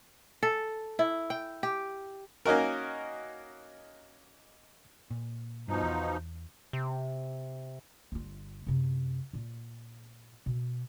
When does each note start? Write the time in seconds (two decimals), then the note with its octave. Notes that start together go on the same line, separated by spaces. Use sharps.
0.43 A4
0.99 E4
1.30 G5
1.63 G4
2.46 A#3 C#4 D#4 F#4 A#4
5.11 A#2
5.68 G2 B2 F3 D#4
5.83 E2
6.73 C3
8.12 G1 F4
8.67 F#2 C3
9.33 A#2 F4
10.46 B2